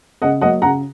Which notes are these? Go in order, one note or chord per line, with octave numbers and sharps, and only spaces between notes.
C#3 D#5 F#5
F#3 A#3 D#5 F#5
C#3 F#5 A#5